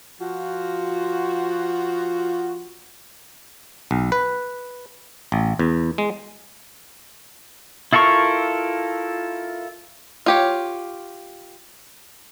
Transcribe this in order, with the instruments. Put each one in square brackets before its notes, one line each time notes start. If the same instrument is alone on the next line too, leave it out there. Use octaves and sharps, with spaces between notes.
[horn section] F3 F4 F#4
[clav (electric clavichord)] B1
B4
A1
E2
G#3
[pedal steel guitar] E4 F4 A4 A#4 C#6
[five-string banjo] F4 G4 C#5